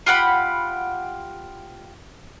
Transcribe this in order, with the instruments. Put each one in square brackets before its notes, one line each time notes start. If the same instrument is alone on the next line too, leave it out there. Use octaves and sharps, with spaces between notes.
[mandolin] F4 G4 F#5 B5